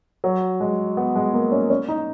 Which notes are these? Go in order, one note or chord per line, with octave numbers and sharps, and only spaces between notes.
F#3
G#3
B3
G#3
A#3
C#4
C#4
D#4